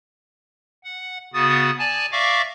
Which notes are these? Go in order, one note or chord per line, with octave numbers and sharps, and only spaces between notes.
F#5
C#3 B3 F#4 D#6 A6
D5 G#5 A5
D5 E5 F5 C#6 D6 A#6